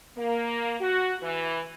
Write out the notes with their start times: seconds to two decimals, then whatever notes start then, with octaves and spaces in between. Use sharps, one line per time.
0.16 A#3
0.80 F#4
1.21 E3